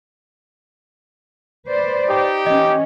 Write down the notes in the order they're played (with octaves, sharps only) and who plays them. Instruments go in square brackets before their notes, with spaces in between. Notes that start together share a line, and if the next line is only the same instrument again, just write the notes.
[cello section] B4 C5 D5
[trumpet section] D#4 G4
[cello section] E3 C#4 [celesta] D#5